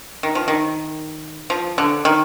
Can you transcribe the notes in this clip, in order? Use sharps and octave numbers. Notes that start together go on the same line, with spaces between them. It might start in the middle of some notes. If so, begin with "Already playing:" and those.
D#3
F3
D#3
F3
D3
D#3